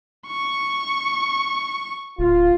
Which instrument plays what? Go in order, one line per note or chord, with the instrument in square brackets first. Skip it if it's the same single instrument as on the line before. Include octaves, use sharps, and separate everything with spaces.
[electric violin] C#6
[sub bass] D1 [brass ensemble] F4